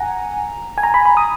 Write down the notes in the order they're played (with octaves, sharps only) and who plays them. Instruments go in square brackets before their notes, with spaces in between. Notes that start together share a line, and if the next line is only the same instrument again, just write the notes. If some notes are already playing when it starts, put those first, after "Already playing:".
Already playing: [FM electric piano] F#5 G#5 A#5
G#5
A#5
B5
B5
D#6